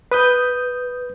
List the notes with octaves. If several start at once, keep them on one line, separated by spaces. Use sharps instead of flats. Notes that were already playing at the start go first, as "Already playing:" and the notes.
B4 D#6 G6